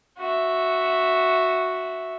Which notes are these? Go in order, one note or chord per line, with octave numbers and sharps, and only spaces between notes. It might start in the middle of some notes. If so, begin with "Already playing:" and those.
F#4 E5